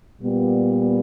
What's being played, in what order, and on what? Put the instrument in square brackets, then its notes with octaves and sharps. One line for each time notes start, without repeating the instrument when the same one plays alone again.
[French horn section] A#2 G3 B3